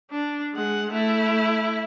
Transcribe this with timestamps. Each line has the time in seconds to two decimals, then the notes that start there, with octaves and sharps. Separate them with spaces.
0.11 D4
0.55 G#3 F#5
0.91 A3 E4